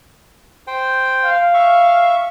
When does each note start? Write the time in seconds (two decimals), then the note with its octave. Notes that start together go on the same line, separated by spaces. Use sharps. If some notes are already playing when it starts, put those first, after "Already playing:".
0.67 C5 G5
1.24 F5
1.54 E5 C#6